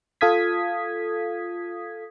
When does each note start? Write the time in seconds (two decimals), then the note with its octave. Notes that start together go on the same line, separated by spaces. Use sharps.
0.21 F4 A4 F5 D#6 G#6 B6